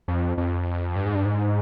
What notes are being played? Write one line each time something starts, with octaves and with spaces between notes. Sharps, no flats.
F2
F2
G2
G#2
G2
G#2